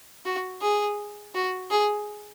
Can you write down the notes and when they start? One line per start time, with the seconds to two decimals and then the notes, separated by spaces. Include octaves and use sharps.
0.25 F#4
0.62 G#4
1.35 F#4
1.71 G#4